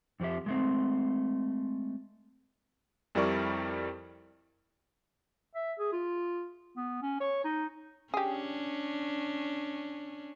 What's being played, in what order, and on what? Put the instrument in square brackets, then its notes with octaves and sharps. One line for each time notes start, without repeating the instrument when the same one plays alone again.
[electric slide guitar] F2 F3 C4 G4 E5
G#3 A3 C4
[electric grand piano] F2 G3 E4 A#4 D5 C#6
[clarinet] E5
G#4
F4
B3
C#4
C#5
D#4
[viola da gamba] C#4 D4 [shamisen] G4 G#4